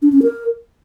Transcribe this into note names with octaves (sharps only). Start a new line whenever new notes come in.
D4
C#4
A#4